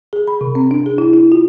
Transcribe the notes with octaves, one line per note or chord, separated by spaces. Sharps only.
G#4
B5
C3
C4
D4
G#4
E4
E4
F4